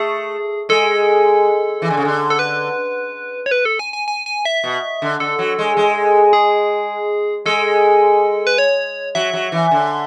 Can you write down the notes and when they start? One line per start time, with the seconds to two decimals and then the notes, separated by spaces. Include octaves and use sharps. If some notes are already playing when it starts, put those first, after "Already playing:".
Already playing: A3 G#4
0.69 G#3 A4
1.82 E3
1.90 D3
1.97 C#3
2.05 D3
2.30 A4
2.39 B4
3.46 C#5
3.51 B4
3.65 A4
3.79 G#5
3.93 G#5
4.08 G#5
4.26 G#5
4.45 E5
4.64 B2
5.02 D3
5.20 D3 A4
5.39 F#3
5.59 G#3
5.77 G#3
6.33 G#4
7.46 G#3 A4
8.47 B4
8.58 C#5
9.15 F#3 E5
9.33 F#3
9.52 E3
9.71 D3